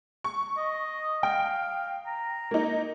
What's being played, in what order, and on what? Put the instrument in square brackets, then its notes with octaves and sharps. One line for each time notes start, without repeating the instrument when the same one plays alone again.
[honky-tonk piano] C#6
[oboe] D#5
[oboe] F5 [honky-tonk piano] G5
[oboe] A#5
[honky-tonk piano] A#3 D#4